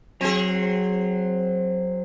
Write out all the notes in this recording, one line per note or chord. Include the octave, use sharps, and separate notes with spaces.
F#3 C4 G#4